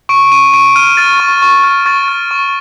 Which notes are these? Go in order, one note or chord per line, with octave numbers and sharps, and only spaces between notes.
C#6 D7
C#6 D#7
C#6 D7
F6 D#7
F6 A6
C#6
C#6
F6
C#6 A6
F6
C#6